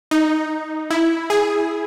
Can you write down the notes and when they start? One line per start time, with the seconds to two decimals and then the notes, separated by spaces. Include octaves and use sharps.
0.11 D#4
0.90 E4
1.30 G#4